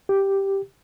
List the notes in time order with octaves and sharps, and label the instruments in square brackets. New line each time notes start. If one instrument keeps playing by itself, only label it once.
[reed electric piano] G4